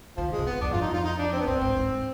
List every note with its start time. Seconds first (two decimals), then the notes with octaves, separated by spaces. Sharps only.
0.17 D#3 F3
0.28 C3
0.32 G#3
0.38 C3
0.46 B3
0.61 F2 D4
0.71 G2 F4
0.81 F2 D#4
0.94 F4
1.05 D#4
1.19 D4
1.33 C4
1.40 B3
1.47 G2 C4
1.61 G#2
1.77 G#2